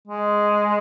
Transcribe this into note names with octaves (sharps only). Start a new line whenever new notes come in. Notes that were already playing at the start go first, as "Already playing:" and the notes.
G#3